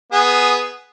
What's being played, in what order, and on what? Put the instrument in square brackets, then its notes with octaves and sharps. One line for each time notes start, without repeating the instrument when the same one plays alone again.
[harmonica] B3 G#4